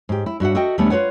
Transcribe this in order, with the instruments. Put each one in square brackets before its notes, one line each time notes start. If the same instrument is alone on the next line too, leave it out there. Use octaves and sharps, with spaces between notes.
[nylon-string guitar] G#2 G4
E4
G2 F#4 E5 F#5
F#4 A4 D#5 E5 G5
D#2 G3 A3 B3 C#4 D4
F4 G4 B4 C#5 F#5